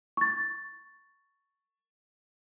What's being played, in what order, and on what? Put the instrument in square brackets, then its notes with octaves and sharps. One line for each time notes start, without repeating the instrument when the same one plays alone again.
[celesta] C#6 A6